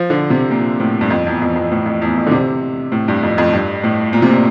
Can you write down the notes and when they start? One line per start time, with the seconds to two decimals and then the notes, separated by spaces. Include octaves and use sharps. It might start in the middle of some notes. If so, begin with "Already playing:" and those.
Already playing: F3
0.10 D3
0.30 C3
0.51 A#2
0.80 A2
1.01 G2
1.10 F2
1.27 E2
1.42 F2
1.56 F2
1.71 A2
1.86 F2
2.02 E2
2.17 F2
2.27 D3
2.31 C3
2.92 A2
3.08 G2
3.23 F2
3.38 F2
3.53 G2
3.84 A2
4.13 A#2
4.22 C3
4.31 A#2